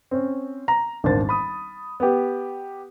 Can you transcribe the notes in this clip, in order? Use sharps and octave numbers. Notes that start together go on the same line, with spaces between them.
C4 C#4
A#5
D#1 G#1 D4 C5 A6
B5 D#6
B3 G4